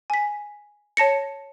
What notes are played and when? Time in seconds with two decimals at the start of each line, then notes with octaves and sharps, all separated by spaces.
0.10 G#5 B6
0.97 C#5 A5 A#6 C#7